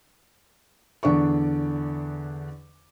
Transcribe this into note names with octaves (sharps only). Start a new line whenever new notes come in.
E2 D3 D4 D5 C#6